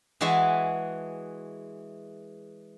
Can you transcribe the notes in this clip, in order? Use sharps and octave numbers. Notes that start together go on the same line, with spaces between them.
E3 G#3 F#4 G#4 E5 A5